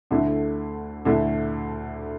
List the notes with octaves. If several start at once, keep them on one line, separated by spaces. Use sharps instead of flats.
D2 D3 A3 E4
D2 D3 A3 E4